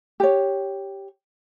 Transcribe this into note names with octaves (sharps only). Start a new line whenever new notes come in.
G4 C#5